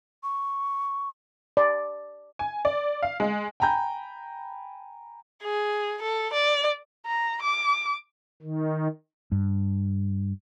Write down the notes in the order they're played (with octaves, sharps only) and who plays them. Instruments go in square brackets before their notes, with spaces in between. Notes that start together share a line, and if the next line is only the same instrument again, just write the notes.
[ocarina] C#6
[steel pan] D5
[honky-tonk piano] G#5
D5
F5
G#3
[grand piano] G5 G#5 A#5 B5 G6
[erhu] G#4
A4
D5
A#5
D6
[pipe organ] D#3
[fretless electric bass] G2